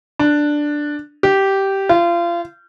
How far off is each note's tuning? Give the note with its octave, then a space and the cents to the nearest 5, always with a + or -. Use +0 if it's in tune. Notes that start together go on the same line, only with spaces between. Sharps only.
D4 +5
G4 -10
F4 -30